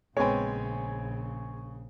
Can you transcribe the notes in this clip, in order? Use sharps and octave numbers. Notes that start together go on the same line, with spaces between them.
A#1 C#3 G#3 B3 C4 C#5 G#5